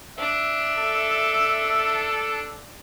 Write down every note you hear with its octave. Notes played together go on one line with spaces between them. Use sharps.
D4 E5
A4